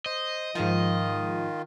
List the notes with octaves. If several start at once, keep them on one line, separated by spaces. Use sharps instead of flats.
C5 D#5
G#2 D#3 F3 F4